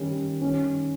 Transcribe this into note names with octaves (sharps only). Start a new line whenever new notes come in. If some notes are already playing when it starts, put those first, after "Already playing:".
Already playing: D#3 G3 C#4
D#3 G3 C#4